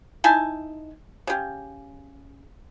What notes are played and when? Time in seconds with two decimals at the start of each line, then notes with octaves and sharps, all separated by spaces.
0.24 D#4 E4 G#5 A5
1.27 C#3 G4